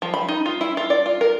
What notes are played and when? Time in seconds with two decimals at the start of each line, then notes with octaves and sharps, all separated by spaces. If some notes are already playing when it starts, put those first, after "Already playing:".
0.02 F3
0.14 B5
0.28 D#4
0.46 F4
0.61 E4
0.77 F4
0.90 D5
1.06 F4
1.21 A#4